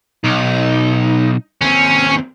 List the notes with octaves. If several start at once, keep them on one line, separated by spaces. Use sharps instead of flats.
B1 D#4
D#2 C4 C#4